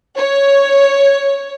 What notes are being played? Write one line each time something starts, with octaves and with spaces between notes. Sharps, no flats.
C#5